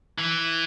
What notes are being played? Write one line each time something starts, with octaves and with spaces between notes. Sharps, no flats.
E3